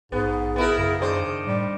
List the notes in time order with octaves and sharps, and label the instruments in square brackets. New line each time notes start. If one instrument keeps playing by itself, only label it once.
[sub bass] A#1 [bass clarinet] G#2 [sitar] B3 [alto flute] G#4
[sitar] B3 E4 A#4
[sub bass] F#2 [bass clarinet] C#3
[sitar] D#3 D4 C5
[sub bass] A2 [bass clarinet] G3